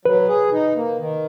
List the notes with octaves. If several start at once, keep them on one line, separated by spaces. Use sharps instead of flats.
F#3 B4
G#4
D#4
A#3
D#3